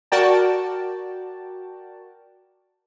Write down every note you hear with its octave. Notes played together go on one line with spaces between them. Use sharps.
F#4 A#4 D5 G5 A5